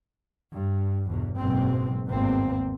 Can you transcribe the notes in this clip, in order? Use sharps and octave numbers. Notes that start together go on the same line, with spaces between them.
G2
G1 E2 B2
F#1 G#2 B2 G#3 C4
G#1 E2 G2 A#3 C4